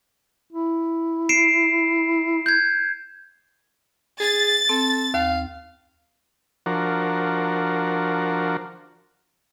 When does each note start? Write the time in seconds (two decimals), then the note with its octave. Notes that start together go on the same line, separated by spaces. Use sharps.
0.53 E4
1.29 C7 D7 E7
2.46 G6 G#6
4.20 G#4 A6
4.69 C4 A4
5.14 D#2 F5
6.66 F3 D4 F#4 A#4